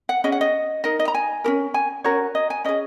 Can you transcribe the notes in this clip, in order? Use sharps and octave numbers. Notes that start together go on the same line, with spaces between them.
F#5
C#4 G#4 D#5
F#5
D#5
D#4 A#4 D#5
D#5
A#5
G#5
C#4 F#4 A#4
G#5
C#4 F#4 A#4 C#5
D#5
G#5
C#4 G#4 D#5